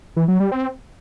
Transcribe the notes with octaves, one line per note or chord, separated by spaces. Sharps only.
E3
F#3
G3
C4